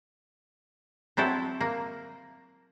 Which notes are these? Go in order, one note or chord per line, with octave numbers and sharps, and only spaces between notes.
F#3 C4 E4 A4
A#3